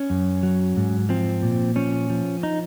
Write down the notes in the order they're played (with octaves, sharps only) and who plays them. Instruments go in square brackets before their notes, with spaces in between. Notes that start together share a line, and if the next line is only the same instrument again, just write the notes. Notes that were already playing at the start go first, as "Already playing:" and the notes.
Already playing: [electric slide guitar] C#4
F#2
F#3
G#2
F3 C4
A#2
F3 C#4
F3
D#4